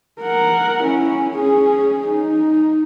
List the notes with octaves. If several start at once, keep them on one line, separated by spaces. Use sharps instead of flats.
A#4 F#5
C#4 E4
C#4 G#4
D#4